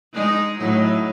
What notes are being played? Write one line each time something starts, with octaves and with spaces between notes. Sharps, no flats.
G#3 D#4
A2 F#3 D#4